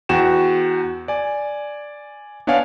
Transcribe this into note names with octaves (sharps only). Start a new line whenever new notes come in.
E2 F#4 G5 E7
D5 G#5
B3 D4 C#5 D5 F5 G#5